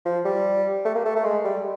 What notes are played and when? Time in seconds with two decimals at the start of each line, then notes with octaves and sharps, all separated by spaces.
0.05 F3
0.25 G3
0.85 A3
0.94 A#3
1.05 A3
1.15 A3
1.24 G#3
1.44 G3